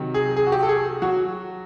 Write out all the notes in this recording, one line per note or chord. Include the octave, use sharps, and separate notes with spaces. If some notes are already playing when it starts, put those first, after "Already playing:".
Already playing: C3 D#3 F#3
G#4
G#4
F#4
G4
A4
G#4
F#3 F#4